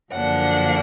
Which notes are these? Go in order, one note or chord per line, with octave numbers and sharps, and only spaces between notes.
F#2 D3 F3 A#3 D4 F#5